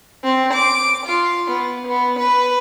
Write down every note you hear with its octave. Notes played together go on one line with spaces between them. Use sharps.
C4
D6
F4
B3
B3
B4